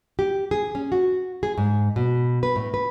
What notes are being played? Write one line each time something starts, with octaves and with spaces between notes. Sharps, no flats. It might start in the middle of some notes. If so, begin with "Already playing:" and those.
G4
G#4
C#4
F#4
G#4
G#2
B2
B4
A2
B4